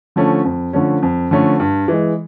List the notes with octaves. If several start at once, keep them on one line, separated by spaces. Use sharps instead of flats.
D3 F3 A3 C#4
F2
D3 F3 A3 C#4
F2
D3 F3 A3 C#4
G2
E3 G#3